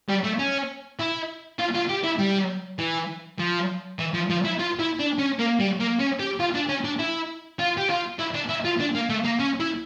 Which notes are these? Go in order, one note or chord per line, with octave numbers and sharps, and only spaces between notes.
G3
A3
C#4
E4
F4
F4
G4
E4
G3
E3
F3
E3
F3
F3
E4
F4
E4
D4
C#4
A#3
G3
A#3
C#4
G4
F4
D4
C#4
D4
E4
F4
G4
F4
E4
D4
E4
F4
D4
A#3
A3
A#3
C#4
E4